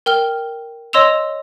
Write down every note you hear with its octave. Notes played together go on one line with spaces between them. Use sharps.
A#4 G5 F6 G7
C#5 D#5 C6 E6 E7 F7